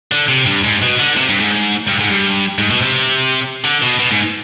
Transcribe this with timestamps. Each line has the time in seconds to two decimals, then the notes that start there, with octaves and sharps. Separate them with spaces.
0.11 D3
0.28 C3
0.46 G2
0.64 G#2
0.82 B2
1.00 D3
1.17 C3
1.29 G2
1.40 G#2
1.88 G2
2.00 G#2
2.11 G2
2.58 G#2
2.70 B2
2.81 C3
3.65 D3
3.83 B2
4.00 B2
4.11 G#2